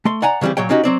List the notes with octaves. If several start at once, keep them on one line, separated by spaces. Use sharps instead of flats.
A3 C6
D5 F#5 G#5 A#5
C#3 E3 G3 C4 G4
A#2 F#3 C#5 G5
A#3 C#4 D#4 F#4 G4
F#3 C4 D5